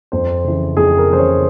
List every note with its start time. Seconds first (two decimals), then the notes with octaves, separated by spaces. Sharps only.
0.12 F2 C5
0.44 C#3 E3
0.77 F2 G#4
0.98 A#4
1.08 C#3 E3 C5
1.19 C#5